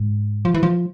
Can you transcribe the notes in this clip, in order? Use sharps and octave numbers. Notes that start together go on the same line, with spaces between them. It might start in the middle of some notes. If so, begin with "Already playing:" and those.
Already playing: G#2
F3
E3
F3